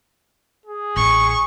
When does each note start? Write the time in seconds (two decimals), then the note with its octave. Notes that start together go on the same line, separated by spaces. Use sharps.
0.66 G#4
0.97 A1 C#6